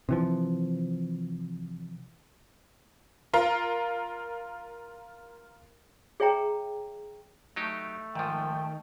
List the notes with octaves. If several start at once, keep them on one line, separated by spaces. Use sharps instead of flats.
C3 E3 F3
F4 A#4
G#4 C#5 E5 G5 A#5
F#3 A3 D#4 G4
G#2 D#3 F3 G5